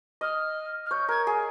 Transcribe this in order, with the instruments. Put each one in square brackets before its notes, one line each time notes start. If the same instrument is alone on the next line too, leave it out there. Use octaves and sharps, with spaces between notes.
[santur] D#5 [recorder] F6
[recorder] F6
[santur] C#5 [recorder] G6
[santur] A#4 [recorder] G#6
[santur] G#4